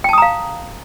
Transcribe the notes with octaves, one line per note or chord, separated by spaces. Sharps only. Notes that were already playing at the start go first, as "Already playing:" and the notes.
F5 G5 A5 A#5 D#6